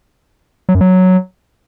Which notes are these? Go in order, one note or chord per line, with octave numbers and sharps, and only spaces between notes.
F#3
F#2
F#3